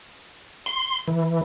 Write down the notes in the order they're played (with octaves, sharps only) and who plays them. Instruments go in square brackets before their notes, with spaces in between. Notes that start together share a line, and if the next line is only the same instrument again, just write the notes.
[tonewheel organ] C6
E3